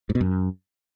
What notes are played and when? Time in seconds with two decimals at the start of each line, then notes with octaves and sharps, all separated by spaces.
0.10 G#2
0.15 B2
0.21 F#2